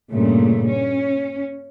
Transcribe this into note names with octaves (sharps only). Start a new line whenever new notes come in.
G2 A#2 C#3 A3
C#4